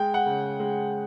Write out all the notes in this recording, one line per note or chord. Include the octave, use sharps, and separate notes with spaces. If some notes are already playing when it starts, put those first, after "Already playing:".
Already playing: G#3 G5
F#5
C#3
G#3